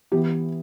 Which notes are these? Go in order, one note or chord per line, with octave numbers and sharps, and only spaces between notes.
E3 B3 G4